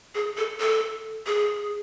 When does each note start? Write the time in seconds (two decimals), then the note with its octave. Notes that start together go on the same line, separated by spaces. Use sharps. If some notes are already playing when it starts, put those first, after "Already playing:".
0.15 G#4
0.37 A4
0.60 A4
1.26 G#4